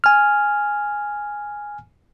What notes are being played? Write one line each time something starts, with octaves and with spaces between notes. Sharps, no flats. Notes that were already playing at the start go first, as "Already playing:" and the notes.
G#5 F6